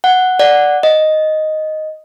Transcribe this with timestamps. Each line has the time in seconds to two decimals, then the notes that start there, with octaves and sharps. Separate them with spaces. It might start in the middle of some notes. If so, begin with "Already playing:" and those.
0.04 F#5
0.39 D5 F#5
0.83 D#5